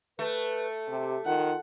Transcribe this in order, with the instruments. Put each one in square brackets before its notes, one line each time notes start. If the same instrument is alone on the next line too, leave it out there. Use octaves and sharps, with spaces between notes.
[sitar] A3 [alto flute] B4
[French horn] C3 [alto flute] G4
[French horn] D#3 [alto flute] F4 [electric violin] F#5